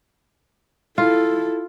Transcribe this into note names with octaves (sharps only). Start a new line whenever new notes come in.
E4 F4 A4